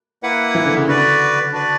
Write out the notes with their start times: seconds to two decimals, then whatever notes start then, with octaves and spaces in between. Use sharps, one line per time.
0.23 A#3 E4 B4 F#5
0.55 E3
0.65 D3
0.77 C#3
0.87 D3 F#4 B4 D5
1.52 D4 F#4 B4 D5